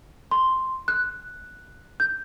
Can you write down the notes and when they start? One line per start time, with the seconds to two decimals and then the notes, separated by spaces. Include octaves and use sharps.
0.31 C6
0.88 F#6
2.00 G6